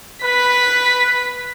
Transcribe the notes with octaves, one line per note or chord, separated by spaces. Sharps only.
B4 B6